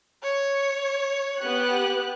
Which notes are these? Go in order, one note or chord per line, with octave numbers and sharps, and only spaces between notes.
C#5
B3 G4 F#6